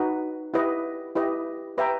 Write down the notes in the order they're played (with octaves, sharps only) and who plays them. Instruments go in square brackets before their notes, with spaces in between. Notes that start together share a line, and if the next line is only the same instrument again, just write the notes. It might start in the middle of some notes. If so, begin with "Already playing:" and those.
Already playing: [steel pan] D#4 F#4 B4
E4 G4 B4 D#5
E4 G4 B4 D#5
G4 B4 E5 G5 A#5